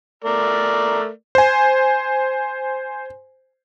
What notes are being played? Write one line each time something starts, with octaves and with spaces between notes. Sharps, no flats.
A3 A#4 D5
C5 G#5